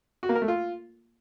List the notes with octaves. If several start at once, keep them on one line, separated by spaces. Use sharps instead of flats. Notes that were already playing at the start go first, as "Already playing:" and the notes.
F#4
A#3
A#4
A3
F4